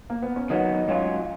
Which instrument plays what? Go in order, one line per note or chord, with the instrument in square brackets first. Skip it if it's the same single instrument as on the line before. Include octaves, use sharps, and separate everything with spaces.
[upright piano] A#3
B3
C#4
[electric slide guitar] D#3 F#3 B3 [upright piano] D#4
[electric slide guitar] G#2 F#3 C#4 F4